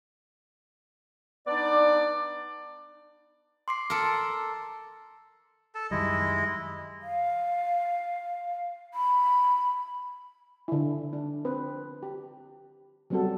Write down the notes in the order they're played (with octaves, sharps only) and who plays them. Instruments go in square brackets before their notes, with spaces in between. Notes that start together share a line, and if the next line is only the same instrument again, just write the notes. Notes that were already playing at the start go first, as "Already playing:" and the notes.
[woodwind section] B3 D4 D#4 D5
[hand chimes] C6 D6 C7
[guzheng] A4 A#4
[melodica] A4 A5
[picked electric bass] F#2 D#3 G3 [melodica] G#3 E4 D#5
[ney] F5
B5
[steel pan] D3 E4
D4
C4 B4 C5
G4
F#3 G3 B3 C4 F#4 A4